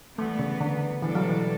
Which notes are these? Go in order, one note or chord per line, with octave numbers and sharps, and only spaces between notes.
E3 G3 A3 B3
C#3
D3
B2 E3 G3 D4 A4
F#3
E3